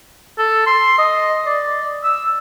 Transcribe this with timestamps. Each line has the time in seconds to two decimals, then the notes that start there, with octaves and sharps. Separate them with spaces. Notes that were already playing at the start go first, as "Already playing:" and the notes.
0.38 A4
0.67 C6
0.99 D#5
1.46 D5
2.04 E6